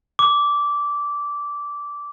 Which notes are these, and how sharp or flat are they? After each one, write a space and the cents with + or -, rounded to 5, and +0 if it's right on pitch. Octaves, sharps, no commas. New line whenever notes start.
D6 -15